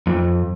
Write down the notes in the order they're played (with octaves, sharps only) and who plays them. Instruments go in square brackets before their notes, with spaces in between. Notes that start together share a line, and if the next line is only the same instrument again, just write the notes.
[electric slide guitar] F2